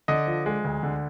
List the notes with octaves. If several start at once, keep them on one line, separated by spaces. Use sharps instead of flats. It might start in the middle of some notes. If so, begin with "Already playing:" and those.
D3 D#5
F3
G#3
D2
D3